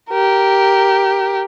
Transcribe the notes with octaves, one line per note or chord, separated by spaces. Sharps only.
G4 A#4